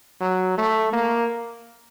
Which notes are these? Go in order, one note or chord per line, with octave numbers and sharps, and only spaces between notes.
F#3
A3
A#3